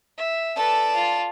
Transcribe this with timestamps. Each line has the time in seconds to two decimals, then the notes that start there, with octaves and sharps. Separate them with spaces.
0.17 E5
0.56 A4 B4 D5 A5
0.95 F4